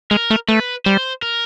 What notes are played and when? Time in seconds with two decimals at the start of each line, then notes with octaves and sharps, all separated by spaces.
0.11 G#3 A#4
0.30 A3
0.48 A3 B4
0.85 G3 C5
1.22 A#4